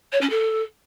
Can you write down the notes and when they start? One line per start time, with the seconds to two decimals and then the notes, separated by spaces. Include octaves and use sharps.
0.12 C#5
0.21 C#4
0.29 A4